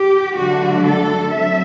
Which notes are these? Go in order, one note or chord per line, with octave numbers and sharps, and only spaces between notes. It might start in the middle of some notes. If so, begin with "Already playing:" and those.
Already playing: G4
D3 F#3 A3 D4 F#4
A4
F#3 C4 E5